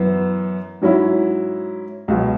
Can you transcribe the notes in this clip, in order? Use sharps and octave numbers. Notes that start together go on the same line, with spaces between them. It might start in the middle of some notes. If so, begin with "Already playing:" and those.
Already playing: F#2 E3 B3
G#2 F#3 C#4 E4
C#2 B2 F#3